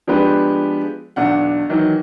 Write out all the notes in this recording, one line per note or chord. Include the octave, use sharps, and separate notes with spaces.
F3 G#3 B3 D4 G4 B4
B1 E2 D4 F#5
D#3 E3 F#3